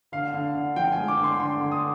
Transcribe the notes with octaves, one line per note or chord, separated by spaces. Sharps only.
D3 F5
D3
D3
F3 G5
G#5
G#3
D6
D3
C6
D3 C6
D3
D#6